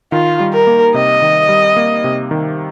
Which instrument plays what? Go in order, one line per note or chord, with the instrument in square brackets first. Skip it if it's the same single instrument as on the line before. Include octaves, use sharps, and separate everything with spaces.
[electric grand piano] D#3 [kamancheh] F4
[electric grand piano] G3
[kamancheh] A#4
[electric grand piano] A#3
[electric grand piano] C3 [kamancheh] D#5
[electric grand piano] D#3
G3
A#3
C3
D#3